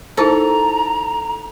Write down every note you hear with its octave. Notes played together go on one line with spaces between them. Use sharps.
D#4 E4 A4 C5 A#5